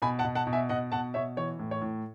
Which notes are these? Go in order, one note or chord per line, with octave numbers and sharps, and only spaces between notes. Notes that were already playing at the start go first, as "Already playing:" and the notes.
B2 G#5 B5
F#5 A5
B2
F#5 A5
B2
E5 G#5
B2 D#5 F#5
B2 F#5 A5
B2 C#5 E5
E3 C#5
A2
C#5
A2